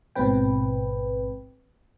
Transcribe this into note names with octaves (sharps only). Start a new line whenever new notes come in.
A1 G#2 B2 C4 B4 G5